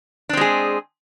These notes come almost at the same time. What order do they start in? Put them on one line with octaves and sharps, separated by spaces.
D4 C4 G#3 G#4